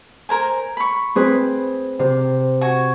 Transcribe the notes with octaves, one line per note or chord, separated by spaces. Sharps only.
A#4 C5 G#5
B5 C#6
C4 G#4 B4
C3
F#4 G#5 C#6